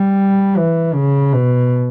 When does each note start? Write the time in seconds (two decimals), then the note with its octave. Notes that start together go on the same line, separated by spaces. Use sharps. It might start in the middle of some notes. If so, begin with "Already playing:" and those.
Already playing: G3
0.57 E3
0.94 C#3
1.32 B2